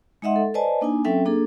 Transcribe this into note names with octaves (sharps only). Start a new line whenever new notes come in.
G#3 D#4 D#5 E5 F#5 C6
A4
B4 C5 D5 D#5 G#5 A5
A#3 D4 D#4 G#5
F#3 C4 C#4 A4 E5 G5
A#3 D4 G#4 A4